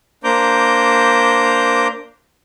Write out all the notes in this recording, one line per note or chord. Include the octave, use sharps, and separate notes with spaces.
A#3 D4 C5 A#5 D6 G6